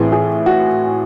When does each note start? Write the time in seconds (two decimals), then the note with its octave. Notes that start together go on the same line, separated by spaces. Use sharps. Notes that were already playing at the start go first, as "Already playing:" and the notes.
Already playing: A2 E3 C4 G#4
0.12 G#4
0.46 F#4